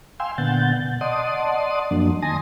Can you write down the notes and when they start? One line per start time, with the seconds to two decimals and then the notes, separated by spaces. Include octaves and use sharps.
0.20 F5 G5 G#5 C6 E6
0.38 A#2 D3 B3 F#5 G6 A6
0.82 B2
1.01 D5 D#5 F#5 A5 C6 D#6
1.91 F#2 F3 F#3 A#3 D4
2.22 D#3 G#5 A5 C6 D#6 A#6